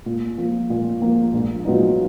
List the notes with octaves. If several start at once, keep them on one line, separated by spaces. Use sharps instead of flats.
A#2
F3 A#3 F4
A#2
F3 A#3 F4
A#1
A#2 F#3 B3 D#4